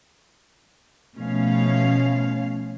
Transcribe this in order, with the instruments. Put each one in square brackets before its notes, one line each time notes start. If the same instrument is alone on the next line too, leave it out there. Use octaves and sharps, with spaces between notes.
[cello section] B2 F3 A3 C#4 F5